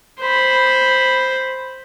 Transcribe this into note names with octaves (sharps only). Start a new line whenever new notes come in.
C5 B5